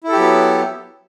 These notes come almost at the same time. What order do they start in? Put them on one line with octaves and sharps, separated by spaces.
E4 A4 G4 F#3 B3